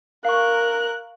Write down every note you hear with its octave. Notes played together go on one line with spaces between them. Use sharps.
A#4 F5 C#6 F#6